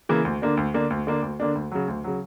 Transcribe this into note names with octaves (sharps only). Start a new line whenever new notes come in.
C#3 E3 A#3
D2
D3 A#3 D4
D2
D3 A#3 D4
D2
D3 A#3 D4
D2
D3 A#3 D4
D2
C#3 F#3
D2
C#3 F#3